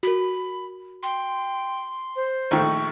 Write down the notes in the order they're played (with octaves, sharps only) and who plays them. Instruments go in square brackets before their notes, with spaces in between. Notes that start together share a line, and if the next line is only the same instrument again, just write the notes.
[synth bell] F#4 A#4 [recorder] B5
[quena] G5 [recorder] C6
[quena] C5
[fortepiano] A#1 D#3 A3 [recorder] C#6